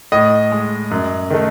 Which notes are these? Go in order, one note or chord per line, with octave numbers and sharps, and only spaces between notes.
A2 D#5
G#3
F#2
D#3 A3